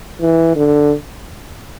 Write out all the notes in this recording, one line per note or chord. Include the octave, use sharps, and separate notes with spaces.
E3
D3